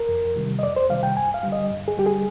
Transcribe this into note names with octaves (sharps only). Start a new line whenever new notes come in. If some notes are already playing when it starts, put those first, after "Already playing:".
Already playing: A#4
F2
C3 D#3 G3
D#5
F2 D5
C5
C3 D#3 G3 F5
G5
G2 G#5
F5
D3 G3
D#5
G2
G#4
D3 G3 G4
G#4